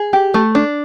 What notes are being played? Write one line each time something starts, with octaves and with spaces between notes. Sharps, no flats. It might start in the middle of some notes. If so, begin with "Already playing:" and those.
Already playing: G#4
G4
A3
D4